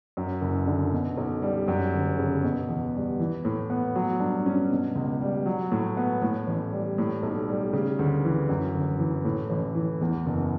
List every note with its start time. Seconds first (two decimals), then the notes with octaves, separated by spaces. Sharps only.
0.17 F#2
0.41 F#1
0.67 D3
0.93 B2
1.17 B1
1.42 G3
1.68 F#2
1.94 G1
2.19 C#3
2.43 B2
2.69 E2
2.95 G3
3.20 E3
3.45 A2
3.70 B3
3.96 F#3
4.20 G2
4.46 C#4
4.71 B2
4.95 C#2
5.21 G3
5.46 F#3
5.72 A2
5.97 B3
6.22 A2
6.47 A1
6.72 G3
6.98 A2
7.23 B1
7.49 G3
7.73 C#3
7.99 D2
8.25 E3
8.49 F#2
8.74 G1
8.99 E3
9.25 A2
9.50 A1
9.75 E3
10.01 E2
10.26 F#1